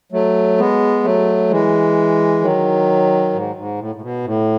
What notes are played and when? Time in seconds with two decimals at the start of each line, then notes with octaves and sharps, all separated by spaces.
0.12 F#3 A3
0.58 G#3 B3
1.03 F#3 A3
1.50 E3 G#3
2.41 D#3 F#3
3.33 G#2
3.56 G#2
3.79 A2
3.95 A2
4.01 B2
4.25 A2